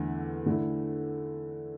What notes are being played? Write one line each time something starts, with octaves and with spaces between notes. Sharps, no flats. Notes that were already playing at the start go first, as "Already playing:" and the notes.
Already playing: E2 D3 A3 E4 B4
D3 A3 E4